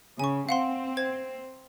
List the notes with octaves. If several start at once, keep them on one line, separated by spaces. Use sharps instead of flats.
C#3 G#5 C#6
C4 F5 F#5 C6
C5 G#6